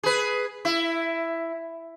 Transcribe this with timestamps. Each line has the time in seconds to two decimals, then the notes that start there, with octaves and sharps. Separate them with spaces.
0.03 G#4 B4
0.65 E4